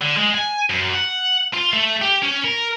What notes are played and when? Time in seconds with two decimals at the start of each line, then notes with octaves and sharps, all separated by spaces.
0.01 D3
0.17 G#3
0.34 G#5
0.70 F#2
0.94 F#5
1.53 F4
1.73 A3
2.02 G4
2.23 C#4
2.45 A#4